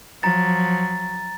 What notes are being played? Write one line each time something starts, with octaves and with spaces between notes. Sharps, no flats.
F3 F#3 A#5 A6